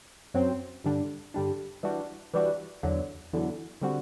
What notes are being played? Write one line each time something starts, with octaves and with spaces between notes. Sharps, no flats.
F#2 F#3 C4
G2 D3 G3 D4
G2 D3 G3 D4
E3 G3 D4 F#4
E3 G3 D4 F#4
E2 D3 F#3
E2 D3 F#3
D3 G3 C4 F#4